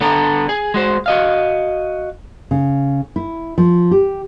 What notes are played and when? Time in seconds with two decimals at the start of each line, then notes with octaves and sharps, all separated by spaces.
0.01 D3 B3 D4 A4 A#5
0.49 G#4
0.74 G#3 F#4 C5
1.06 F#4 D#5 F5
2.51 C#3
3.16 E4
3.58 F3
3.91 G4